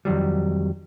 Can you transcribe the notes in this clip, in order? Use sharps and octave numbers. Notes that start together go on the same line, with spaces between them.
F2 D#3 F#3 G3